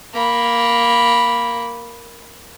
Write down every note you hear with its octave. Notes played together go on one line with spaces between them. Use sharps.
A#3 B5